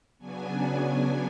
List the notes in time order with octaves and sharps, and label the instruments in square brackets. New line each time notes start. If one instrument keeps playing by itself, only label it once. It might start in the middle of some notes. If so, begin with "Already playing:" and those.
[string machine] C#3 F#3 B3 D4 G#5